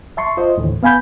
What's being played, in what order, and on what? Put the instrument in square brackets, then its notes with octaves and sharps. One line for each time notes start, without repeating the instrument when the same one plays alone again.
[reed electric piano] E5 A5 C6 C#6
F4 C5 D#5
D#2 A2 D3 E3
B3 F5 G#5 B5 G6